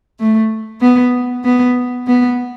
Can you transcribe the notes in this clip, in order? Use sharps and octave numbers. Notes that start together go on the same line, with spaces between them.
A3
B3
B3
B3